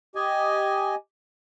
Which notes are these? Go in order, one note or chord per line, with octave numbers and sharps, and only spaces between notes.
G4 D#5 G#5